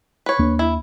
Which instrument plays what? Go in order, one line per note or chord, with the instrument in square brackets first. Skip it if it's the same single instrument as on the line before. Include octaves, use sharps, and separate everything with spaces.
[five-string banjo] B4 C#5
[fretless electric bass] D#2 A#3 D4
[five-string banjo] E4